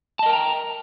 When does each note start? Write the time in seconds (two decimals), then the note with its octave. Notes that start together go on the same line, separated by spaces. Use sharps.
0.19 A5
0.23 D#5
0.26 A#4
0.29 G5
0.33 A#5